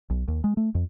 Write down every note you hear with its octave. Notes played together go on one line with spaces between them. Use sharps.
B1
D#2
G#3
A3
F2